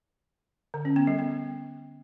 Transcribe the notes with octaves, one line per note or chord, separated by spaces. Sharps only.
D3
C#4
B3
G3
B3